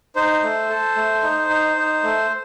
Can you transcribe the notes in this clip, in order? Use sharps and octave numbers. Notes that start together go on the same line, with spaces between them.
D#4 C5
A3
A4
A3
D#4
D#4
D#4
A3